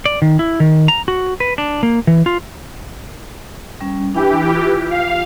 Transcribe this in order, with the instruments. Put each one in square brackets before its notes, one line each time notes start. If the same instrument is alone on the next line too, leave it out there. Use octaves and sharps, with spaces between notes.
[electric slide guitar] D5
D#3
E4
D#3
A#5
F#4
B4
D4
A#3
E3
F4
[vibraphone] G3 C#4
[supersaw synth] E3 G4 [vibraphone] D4 G5
[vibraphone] F4
[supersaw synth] F5